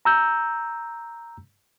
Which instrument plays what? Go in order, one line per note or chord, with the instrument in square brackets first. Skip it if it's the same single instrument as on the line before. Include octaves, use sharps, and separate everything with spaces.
[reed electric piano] A#5 E6 G6